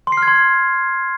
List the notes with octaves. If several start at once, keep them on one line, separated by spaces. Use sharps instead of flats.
C6
C7
F6
G#6
C6